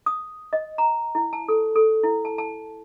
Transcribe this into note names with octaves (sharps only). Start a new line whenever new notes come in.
D#6
D#5
A#5
E4
A5
A4
A4
E4
A5
A5